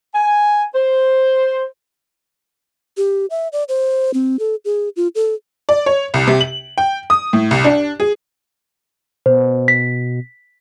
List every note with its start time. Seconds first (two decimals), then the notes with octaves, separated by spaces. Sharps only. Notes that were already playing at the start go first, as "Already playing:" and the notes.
0.14 G#5
0.75 C5
2.97 G4
3.30 E5
3.53 D5
3.69 C5
4.14 C4
4.39 A4
4.65 G#4
4.96 F4
5.15 A4
5.69 D5
5.86 C#5
6.14 C2
6.27 C3
6.41 F#7
6.78 G5
7.10 D#6
7.33 A2
7.51 C2
7.65 D4
8.00 G#4
9.26 B2 C5
9.68 B6